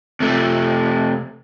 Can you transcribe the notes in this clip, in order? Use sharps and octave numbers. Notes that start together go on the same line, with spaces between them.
C3 A3